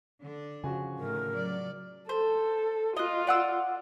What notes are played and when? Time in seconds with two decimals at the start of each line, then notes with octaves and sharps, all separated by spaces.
0.22 D3 D4
0.64 C#3 F3 F#4 G#5
0.98 A2 D#3 A3 A#4
1.30 F#3 D5
2.09 A4 C5
2.97 F4 D#5 F#6
3.27 D5 F#5 E6